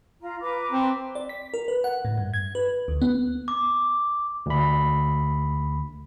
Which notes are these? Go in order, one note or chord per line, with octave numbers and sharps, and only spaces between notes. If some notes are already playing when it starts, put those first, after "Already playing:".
F4 A#5
B4 A#5 D6
C4
D5
B6
A#4
B4
F#5
A2
G2
G#6
B4
D2
B3
D6
D2 B5